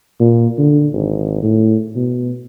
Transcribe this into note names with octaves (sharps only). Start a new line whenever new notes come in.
A#2
D3
G#1
A2
B2